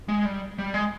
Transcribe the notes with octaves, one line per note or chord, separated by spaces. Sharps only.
G#3
G3
G3
G#3